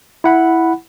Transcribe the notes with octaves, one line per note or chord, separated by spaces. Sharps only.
E4 F#5 B5